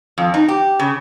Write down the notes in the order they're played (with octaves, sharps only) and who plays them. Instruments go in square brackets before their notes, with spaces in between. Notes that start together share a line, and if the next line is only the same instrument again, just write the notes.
[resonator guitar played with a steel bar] F2
D#4
G4
C#3